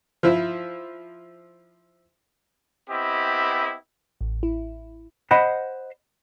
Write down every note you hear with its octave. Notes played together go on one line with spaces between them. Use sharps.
F3 E4
B3 C4 E4 G4 D#5
A1
E4
C5 D#5 F#5 B5